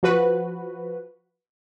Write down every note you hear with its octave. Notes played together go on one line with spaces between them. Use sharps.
F3 F#4 B4